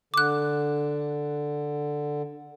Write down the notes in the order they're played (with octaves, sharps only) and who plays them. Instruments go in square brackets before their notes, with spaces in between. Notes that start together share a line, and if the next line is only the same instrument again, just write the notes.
[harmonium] D3 [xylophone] D6 F#6